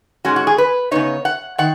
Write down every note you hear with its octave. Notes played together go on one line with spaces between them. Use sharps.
G#2 D#3 G#3 C#4 F#4
F#4
G#4
B4
C#3 B3 D#4 C#5
F#5
D#3 F#5